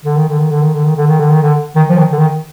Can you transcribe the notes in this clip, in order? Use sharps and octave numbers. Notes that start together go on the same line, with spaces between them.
D3
D#3
D3
D#3
D3
D#3
D3
D#3
D3
D#3
D3
D#3
D3
D#3
F3
D#3
D3
D#3